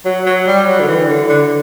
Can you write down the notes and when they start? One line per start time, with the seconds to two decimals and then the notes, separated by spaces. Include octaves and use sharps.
0.05 F#3
0.25 F#3
0.47 G3
0.67 F#3
0.80 D3
0.88 E3
1.09 D3
1.29 D3